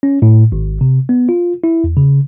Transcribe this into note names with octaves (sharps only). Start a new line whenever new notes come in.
C#4
A2
G#1
C3
B3
F4
E4
E2
C#3